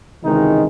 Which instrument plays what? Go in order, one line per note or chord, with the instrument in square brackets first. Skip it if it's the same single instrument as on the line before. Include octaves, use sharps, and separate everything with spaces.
[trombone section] C#2 C3 D#3 E3 G#3 D#4